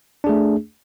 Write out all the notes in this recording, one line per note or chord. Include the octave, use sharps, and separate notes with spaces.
A3 D4 G#4